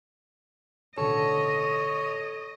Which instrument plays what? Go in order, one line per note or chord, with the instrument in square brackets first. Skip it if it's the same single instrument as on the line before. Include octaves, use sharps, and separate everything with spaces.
[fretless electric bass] A1 B2 D3 [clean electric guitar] A4 [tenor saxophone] C#5 [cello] D#5